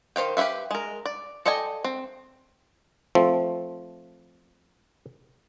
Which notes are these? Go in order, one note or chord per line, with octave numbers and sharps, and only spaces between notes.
D#3 C5 F5 G5
G4 B4 C5 E5 F5
G#3 A#4
D5
A4 D5 D#5 G5 G#5
C4
F3 A3 C4